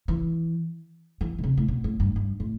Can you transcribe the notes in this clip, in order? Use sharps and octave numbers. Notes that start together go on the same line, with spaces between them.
E3
E3
B2
C3
A2
B2
A2
G2
G2
A2